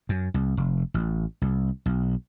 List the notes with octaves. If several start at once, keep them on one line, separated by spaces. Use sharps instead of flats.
F#2
C2
F1
A1
C2
B1